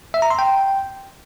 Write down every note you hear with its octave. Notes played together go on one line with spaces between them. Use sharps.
E5
A#5
C6
G5